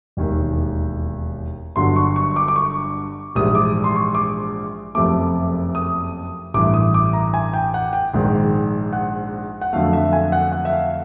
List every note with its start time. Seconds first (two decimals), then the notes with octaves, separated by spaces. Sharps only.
0.17 E1 D#2 D#3
1.76 G1 G2 D3 F#3 C6
1.96 C#6
2.16 C#6
2.36 D6
2.48 D6
2.56 C#6
3.35 A#1 G#2 E3 G3 D#6
3.55 D6
3.84 C6
3.96 C#6
4.15 D6
4.95 F#1 F2 C3 F3 A3 D6
5.75 D#6
6.54 A1 G2 E3 D6
6.74 D#6
6.94 D6
7.13 A#5
7.34 G#5
7.54 G5
7.74 F#5
7.93 G5
8.14 A#1 G#2 D#3 G#3
8.93 F#5
9.61 F#5
9.73 F2 D3 F#3 A3 F5
9.93 E5
10.13 G#5
10.32 F#5
10.52 F#5
10.65 E5
10.73 F5